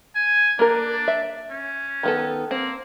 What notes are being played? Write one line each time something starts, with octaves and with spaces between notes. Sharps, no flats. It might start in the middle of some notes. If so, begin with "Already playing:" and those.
G#5
A#3 D4 A#4
E5
C#4
D#3 B3 A4
A#3 C4